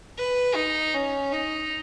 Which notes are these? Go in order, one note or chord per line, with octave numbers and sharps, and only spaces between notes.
B4
D#4
C#4
D#4